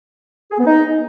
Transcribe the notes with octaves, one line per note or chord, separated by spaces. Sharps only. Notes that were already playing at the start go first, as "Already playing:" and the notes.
G#4
B3
D#4